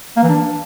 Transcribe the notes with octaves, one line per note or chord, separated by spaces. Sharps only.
A#3
E3
D4